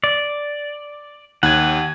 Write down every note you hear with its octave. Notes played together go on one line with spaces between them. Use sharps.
D5
D#2 F#5 G#6